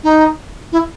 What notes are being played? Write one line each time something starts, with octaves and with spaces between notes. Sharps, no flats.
D#4
E4